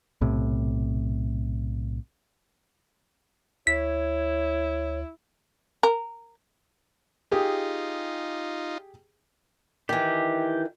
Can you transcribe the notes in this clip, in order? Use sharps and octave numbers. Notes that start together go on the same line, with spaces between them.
B1 A2 C3
D2 E4 C#5 B6
A#4
D#4 F4 G4 G#4
D#3 E3 G4